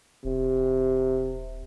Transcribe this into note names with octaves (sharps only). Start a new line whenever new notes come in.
D#1 C3